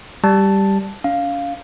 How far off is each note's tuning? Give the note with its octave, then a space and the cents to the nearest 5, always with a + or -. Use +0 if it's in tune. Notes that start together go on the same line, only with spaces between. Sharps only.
G3 +0 A5 +0
C#4 +40 F5 +0